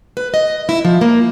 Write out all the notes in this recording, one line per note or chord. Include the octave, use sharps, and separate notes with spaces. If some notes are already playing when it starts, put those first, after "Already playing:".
B4
D#5
E4
F3
A#3